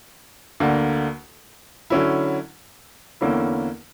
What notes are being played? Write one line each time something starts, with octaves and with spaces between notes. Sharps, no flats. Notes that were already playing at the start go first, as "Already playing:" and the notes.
D2 D3 A#3
D3 F#3 C#4 E4
E2 D3 A#3 C#4 E4